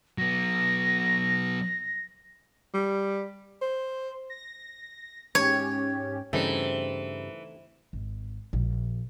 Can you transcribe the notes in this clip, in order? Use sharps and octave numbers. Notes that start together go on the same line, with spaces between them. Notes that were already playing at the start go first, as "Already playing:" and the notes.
F#3 B3 A#6
G3
C5
A#6
G#2 C#4 G4 C#5
G2 C#3 E3 A3 C4 D#4
G#1
A#1